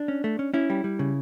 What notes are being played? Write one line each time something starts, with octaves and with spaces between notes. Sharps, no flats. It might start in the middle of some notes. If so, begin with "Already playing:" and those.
Already playing: D4
C#4
A3
C#4
C#4 E4
G3
G3
C#3